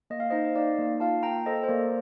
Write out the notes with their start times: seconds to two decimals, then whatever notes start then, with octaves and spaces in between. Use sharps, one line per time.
0.10 A#3 D#5
0.20 F5
0.30 D#4 C5 D#5
0.45 D#5
0.55 D#4 D5 F5
0.79 A#3
1.00 F4 F5 A5
1.23 A#3 G5 A#5
1.46 A4 C5 D#5
1.64 C5
1.68 A#3 A#4 D5